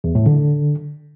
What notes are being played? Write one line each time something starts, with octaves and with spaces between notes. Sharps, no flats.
E2
A2
D3